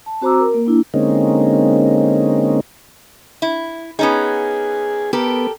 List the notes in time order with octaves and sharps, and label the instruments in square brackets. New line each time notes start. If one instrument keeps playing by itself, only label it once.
[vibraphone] A5
C4 F#4 C5 A#5 D6 E6
A#4
A#3
A#3 D4 E4
[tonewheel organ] D3 G#3 A#3 C4 C#4 D#4
[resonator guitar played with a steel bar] E4
[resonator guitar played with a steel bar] B3 C#4 D#4 [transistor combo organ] G#4
[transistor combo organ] B3 [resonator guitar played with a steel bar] G4 A4 A#4